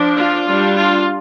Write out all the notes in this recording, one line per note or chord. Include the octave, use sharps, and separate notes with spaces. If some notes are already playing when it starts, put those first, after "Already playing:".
Already playing: F3 D4
F4
G3 D4
F4